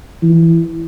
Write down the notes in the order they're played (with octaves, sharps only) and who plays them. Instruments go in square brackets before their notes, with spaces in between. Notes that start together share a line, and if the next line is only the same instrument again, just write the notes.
[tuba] E3